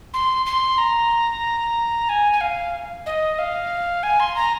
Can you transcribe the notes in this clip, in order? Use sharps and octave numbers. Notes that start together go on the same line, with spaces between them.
C6
C6
A#5
G#5
G#5
F5
D#5
F5
G#5
C6
A#5